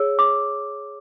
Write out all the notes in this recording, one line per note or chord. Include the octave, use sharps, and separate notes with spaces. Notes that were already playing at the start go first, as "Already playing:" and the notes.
Already playing: G#4 C#5 E6
D6